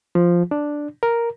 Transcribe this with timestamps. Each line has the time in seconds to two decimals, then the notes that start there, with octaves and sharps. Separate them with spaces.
0.15 F3
0.51 D4
1.03 A#4